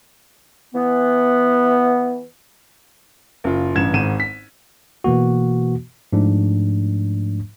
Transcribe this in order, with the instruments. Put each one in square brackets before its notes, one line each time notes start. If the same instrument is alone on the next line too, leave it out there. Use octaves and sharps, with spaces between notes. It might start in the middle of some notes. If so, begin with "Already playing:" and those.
[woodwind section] E3 B3
[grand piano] F#1 F4
A1 G2 G#6 E7
G#1 G#2 D#7 E7
B6
[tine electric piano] B2 E3 A#3 F#4
G#2 F3 A3 D4